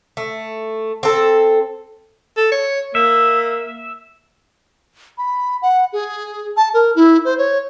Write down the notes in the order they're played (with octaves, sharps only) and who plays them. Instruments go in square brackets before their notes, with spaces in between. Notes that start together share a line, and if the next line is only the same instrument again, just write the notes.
[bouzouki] A3
C4 A4
[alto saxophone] A4
C#5
[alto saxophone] A#3 [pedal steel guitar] E5
[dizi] B5
F#5
G#4
A5
A#4
E4
C5
C#5